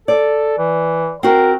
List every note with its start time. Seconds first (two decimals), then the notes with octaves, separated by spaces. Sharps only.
0.08 A4 D5
0.58 E3
1.23 C4 F#4 A#4